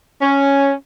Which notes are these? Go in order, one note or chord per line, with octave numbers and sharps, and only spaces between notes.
C#4